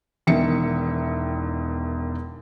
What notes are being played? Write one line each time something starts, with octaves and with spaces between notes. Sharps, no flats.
E1 E2 D#3 E5 C#7